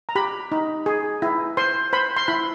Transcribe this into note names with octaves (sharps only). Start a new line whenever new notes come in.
A#5
G4 B5
D#4
G#4
E4
C5 C6
C5 B5
C6
E4 B5